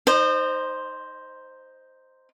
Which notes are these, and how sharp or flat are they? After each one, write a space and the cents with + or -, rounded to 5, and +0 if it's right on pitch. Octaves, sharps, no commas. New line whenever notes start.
D#4 +0 C5 +0 D#5 -40